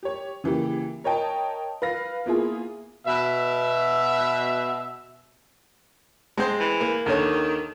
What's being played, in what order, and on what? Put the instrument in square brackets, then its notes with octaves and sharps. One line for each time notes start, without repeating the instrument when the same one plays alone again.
[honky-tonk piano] G4 C#5
C#3 E3 A#3 G4
A#4 C#5 D#5 G5 A5
B4 F5 A#6
A#3 B3 E4 F4 G#4
[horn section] B2 E5
[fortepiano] G#3 C4 C5
[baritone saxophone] E3
[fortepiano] A#3
[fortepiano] D#2 D3 C#5 [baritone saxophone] D#3